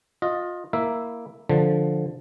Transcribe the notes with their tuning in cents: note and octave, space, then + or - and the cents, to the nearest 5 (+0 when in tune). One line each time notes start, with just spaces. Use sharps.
F4 +25 D#5 +0
A#3 +0 E4 +0 E5 +0
D3 +0 F3 +0